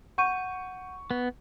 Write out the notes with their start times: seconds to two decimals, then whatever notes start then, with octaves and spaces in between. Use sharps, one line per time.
0.18 F#5 C#6 G6 D#7
1.11 B3